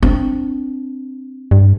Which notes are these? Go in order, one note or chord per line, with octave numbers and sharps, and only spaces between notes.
C4 D4
G2